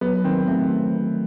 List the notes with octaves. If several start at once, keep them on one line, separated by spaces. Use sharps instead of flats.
F#3 B3
D#3 C4
A3 C4